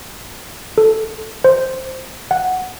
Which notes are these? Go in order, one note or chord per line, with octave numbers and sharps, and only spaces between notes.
A4
C5
F#5